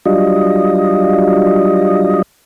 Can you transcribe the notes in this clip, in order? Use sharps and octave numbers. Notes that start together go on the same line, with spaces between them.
F#3 G3 D4 F4 D#5